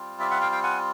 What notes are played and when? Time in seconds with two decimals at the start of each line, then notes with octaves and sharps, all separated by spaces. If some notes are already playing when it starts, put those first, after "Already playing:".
Already playing: G3 C4 F4
0.20 D5 E5
0.30 E5 F#5
0.41 F5 G5
0.52 F5 G5
0.63 F#5 G#5